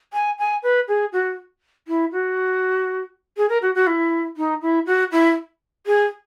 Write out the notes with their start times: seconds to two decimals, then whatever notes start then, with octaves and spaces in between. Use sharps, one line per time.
0.13 G#5
0.39 G#5
0.63 B4
0.88 G#4
1.13 F#4
1.88 E4
2.12 F#4
3.37 G#4
3.49 A#4
3.62 F#4
3.75 F#4
3.87 E4
4.37 D#4
4.62 E4
4.86 F#4
5.12 E4
5.86 G#4